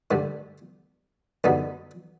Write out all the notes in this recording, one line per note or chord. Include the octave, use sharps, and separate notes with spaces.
G2 D3 G3
F#2 D3 G3 B3 D#4